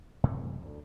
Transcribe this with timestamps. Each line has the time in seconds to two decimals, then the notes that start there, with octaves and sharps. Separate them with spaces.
0.23 F#2 C3 E3 A3
0.61 D2